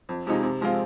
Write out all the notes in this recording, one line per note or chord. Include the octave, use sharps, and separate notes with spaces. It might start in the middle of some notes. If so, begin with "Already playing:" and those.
F2
C3 F3 G#3 D#4
C3
F3 G#3 C4 F4